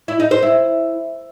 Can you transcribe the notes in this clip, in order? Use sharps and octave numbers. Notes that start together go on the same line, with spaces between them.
E4
D#4
C5
E4